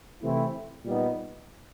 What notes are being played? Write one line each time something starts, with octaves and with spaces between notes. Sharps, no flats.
C3 E3 A3 C4 E4
A#2 G3 B3 D#4